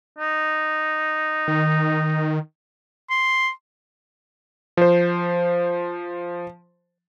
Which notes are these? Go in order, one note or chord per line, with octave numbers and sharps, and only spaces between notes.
D#4
D#3
C6
F3 C5